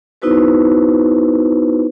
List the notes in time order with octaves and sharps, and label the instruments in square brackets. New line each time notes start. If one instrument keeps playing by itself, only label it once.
[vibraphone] B3 D#4 E4 F#4 B4 C5